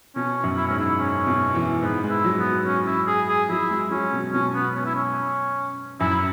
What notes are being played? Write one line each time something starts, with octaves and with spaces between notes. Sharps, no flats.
B2 C#4
F#2
E4
G#2 C#4
E4
C#4
B2
E3
G#2 B3
G#3
E4
F#3
B3
C#4
E4
G#4
G#4
F#3 E4
G#3
F#3 C#4
B2
B2 C#4
B3
C#4
E4
C#4
F#2 E4